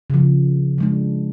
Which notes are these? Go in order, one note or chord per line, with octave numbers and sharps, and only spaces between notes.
C#3 F3
F3 G#3 D4